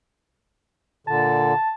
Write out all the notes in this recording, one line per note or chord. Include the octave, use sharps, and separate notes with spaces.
A#2 D3 A5